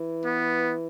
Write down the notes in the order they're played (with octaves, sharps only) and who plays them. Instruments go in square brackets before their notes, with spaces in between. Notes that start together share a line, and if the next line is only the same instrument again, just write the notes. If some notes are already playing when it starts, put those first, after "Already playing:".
Already playing: [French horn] E3
[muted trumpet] B3